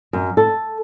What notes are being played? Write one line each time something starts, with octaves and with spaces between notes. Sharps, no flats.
F#2
A4